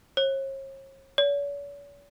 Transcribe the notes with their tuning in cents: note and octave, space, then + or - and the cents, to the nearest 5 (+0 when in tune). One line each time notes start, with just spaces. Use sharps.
C#5 -40
C#5 +45